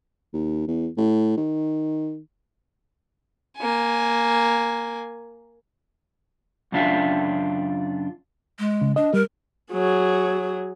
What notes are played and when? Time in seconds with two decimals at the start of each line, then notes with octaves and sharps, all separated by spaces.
0.33 D#2
0.68 E2
0.97 A2
1.37 D#3
3.58 A#3 G#5
6.72 F#2 C#3 D4 F4 E5 G5
8.59 G#3
8.81 C#3
8.96 D4 D#5
9.14 G3 A#4
9.72 F#3 G#4